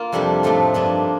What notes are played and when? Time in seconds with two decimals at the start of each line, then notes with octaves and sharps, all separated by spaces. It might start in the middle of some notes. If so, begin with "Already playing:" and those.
Already playing: A#3 F4
0.12 F2 C3 G3 D4 G4
0.43 A2 F3 A3 C4 D#4
0.74 G2 F3 A#3 D4